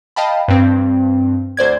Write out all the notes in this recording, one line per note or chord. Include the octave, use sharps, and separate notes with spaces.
D#5 F5 G5 A5 B5
G2 C4
D2 C5 D5 G#6